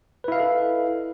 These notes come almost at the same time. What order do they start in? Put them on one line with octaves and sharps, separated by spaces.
B4 E4 F5 D#5 A4